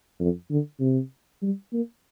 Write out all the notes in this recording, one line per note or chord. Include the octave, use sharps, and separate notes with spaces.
F2
D3
C3
G3
A#3